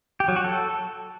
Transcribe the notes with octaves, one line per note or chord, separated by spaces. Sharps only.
G4
F#3
F#4
A4